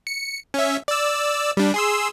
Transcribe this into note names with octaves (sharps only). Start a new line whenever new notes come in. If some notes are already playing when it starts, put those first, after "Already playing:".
C#7
C#4 E5
D5 E6
G3 D4
G#4 C6 E6